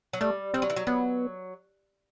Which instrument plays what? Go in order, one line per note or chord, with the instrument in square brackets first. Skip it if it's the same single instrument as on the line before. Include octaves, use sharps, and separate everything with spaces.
[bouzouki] F#3
[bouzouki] G3 [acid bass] A3
[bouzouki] G3 [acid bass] C4
[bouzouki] F#3
E3
F#3
[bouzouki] F#3 [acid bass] B3